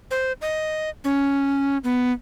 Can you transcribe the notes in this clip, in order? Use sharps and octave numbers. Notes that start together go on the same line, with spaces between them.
C5
D#5
C#4
B3